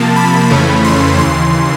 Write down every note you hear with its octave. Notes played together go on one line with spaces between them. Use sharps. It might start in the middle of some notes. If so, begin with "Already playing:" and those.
Already playing: C3 F3 A#3 A5
B5
F2 C#3 E3 A3 C#4 B5
C6
D#2 C#3 E3 C6